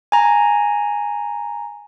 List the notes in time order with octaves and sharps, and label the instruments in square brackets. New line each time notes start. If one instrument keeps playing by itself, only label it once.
[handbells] G#5 A#5